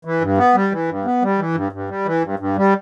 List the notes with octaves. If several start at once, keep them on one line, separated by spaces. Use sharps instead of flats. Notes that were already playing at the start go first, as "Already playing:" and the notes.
E3
G2
B3
G3
E3
G2
B3
G3
E3
G2
G2
G3
E3
G2
G2
G3